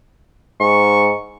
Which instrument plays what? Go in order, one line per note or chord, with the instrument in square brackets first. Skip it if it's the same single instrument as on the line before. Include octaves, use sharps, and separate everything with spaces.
[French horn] G#2 [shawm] C#6